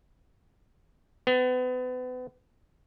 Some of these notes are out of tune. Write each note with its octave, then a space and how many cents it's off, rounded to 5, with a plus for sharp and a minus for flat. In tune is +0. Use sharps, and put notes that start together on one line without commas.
B3 +35